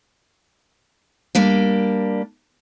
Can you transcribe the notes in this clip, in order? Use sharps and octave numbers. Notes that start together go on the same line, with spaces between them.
G3 A#3 D4